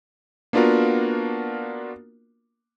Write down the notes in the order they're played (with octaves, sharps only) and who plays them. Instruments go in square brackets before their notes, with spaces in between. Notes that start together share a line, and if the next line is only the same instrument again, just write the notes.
[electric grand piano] A#3 B3 D4 F4 F#4 A#4